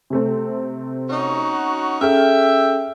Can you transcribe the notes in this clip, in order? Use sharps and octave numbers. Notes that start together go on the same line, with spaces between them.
C3 A3 C4
C#4 D#4 F#4
C#4 G#4 A4 E5 G5 F6